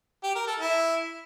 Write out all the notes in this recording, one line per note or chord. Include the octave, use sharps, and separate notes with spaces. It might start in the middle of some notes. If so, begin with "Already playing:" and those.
G4
A#4
A4
E4